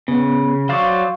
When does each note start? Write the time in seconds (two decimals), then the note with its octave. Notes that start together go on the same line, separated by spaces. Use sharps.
0.08 C#3 B3
0.69 F#3 C5 D5 F5 C#6